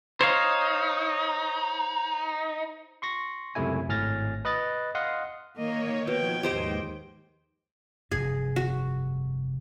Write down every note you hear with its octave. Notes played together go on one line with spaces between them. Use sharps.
D#4 C5 C#5 F5
C6 C#6 A#6
C#2 F#2 C3 A3 E4 G#5
G#1 A2 G#5 F6 A6 A#6
B4 D#5 F#6 A6
D#5 F5 F#5 C6 D#6
D#3 A#3 C#5 D#5
B2 F3 G5 G#6
D#2 G#2 G4 C5 D#5
F1 G2 G#4
F#4